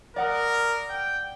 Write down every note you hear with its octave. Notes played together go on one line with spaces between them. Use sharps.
A#4 D5 F#5 D#6
G5